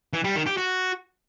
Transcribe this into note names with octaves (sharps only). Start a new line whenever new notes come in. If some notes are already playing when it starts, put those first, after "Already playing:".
E3
G3
D#3
G4
F#4